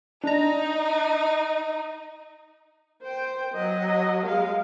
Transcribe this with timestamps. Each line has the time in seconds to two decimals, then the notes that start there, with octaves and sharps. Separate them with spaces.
0.24 D4 D#4 A#5
3.02 C5 G5
3.55 F#3 D#5
4.25 G#3 F5